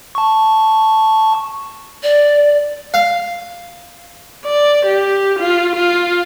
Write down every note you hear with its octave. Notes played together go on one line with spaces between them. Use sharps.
A5 C#6
D5
F5
D5
G4
F4
F4